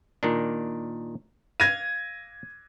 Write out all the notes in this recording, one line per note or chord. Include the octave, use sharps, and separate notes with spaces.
A#2 D#3 D4
F5 G#6 A#6 D#7